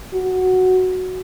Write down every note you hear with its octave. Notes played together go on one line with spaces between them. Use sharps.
F#4